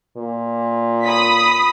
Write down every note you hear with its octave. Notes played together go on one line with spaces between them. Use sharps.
A#2
B5 D#6 B6